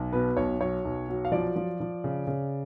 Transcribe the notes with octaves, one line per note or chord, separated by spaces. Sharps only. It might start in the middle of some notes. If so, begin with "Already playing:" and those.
Already playing: B1
B2 B4
B1 C#5
F#3 C#5
B1
F#3
F5
F3 D5
F3
F3
C#3
C#3